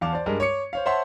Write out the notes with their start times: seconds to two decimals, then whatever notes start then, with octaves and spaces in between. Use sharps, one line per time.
0.01 E2 F5 A5 D6
0.13 C5 D5
0.26 G2 G#3 A#4
0.40 C#5 D6 C#7
0.73 C5 C#5 F5
0.86 C5 C#5 E5 F#5 A5 C6